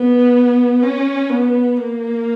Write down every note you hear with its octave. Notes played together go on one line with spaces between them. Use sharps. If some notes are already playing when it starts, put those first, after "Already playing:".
Already playing: B3
C#4
B3
A#3